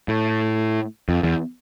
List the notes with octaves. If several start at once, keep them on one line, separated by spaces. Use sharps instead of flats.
A2
F2
E2